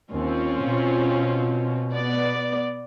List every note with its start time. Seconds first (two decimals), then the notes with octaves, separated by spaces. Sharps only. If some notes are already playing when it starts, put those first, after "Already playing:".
0.10 D#2 C4 C#4 F4
0.63 B2
1.91 B3 D5